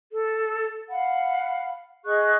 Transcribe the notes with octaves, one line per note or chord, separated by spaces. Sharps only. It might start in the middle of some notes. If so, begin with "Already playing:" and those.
A4
F5 F#5 B5
G#4 D#5 C#6 F#6